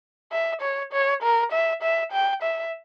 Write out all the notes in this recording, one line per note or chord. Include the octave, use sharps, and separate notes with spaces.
E5
C#5
C#5
A#4
E5
E5
G5
E5